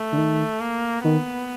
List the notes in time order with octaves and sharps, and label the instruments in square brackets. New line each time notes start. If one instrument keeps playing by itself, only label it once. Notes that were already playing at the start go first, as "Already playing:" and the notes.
Already playing: [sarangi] A3
[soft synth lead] D3
D#3
[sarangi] A#3
[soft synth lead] D#3 [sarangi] B3